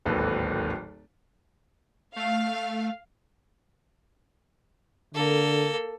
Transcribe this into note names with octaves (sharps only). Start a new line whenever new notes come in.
D1 G#1 D#2 A4 B4
A3 F5
D3 A#3 A4